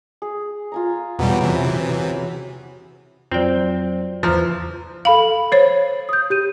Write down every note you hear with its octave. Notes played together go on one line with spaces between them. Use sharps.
G#4
F4 G#5 A#5
E2 B2 F#3 G3 B3 C#4
C3 E3
F2 F#3 C4 F4 C5 D5 G5
E2 C#3 E3 F3 A#5
A4 F5 B5 F#7
C5 C#5 C7
D#6 G6
G4 G6 D#7